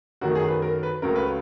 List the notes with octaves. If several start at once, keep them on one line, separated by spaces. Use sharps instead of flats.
F#2 D#3 F#3 A3 F#4
G#4
B4
A#4
B4
C#2 C#3 F#3 A3 A#4
B4